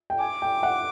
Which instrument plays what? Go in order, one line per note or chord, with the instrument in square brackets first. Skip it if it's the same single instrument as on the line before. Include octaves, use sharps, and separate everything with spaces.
[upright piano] G5
[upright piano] G#5 [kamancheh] D6
[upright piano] G5
F#5